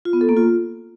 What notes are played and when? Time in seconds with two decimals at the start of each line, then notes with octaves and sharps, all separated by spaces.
0.05 F4
0.13 B3
0.21 A4
0.29 A#3
0.37 F4